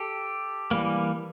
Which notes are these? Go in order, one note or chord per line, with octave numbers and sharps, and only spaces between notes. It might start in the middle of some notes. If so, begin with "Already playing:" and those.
Already playing: G4 A4
E3 G3 A#3